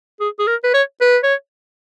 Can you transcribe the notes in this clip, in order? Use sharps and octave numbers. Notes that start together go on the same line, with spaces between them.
G#4
G#4
A#4
B4
C#5
B4
C#5